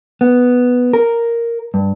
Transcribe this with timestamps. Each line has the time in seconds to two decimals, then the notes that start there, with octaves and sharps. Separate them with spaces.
0.21 B3
0.93 A#4
1.74 G2